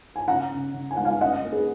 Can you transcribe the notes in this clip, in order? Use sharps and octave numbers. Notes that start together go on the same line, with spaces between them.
G#5
C#3 F#5 A#5
C#3
C#3
G#5
G#3 F#5
F5 G#5
C#4 D#5 F#5
A#3
G#4 B4